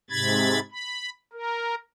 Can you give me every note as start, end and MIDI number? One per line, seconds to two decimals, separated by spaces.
0.10 0.59 44
0.10 0.59 48
0.10 0.59 83
0.10 0.59 92
0.10 0.59 93
0.72 1.10 83
1.33 1.75 70